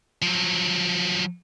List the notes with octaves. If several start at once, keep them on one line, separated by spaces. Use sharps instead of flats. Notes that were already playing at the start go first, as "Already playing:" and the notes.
F3 F#3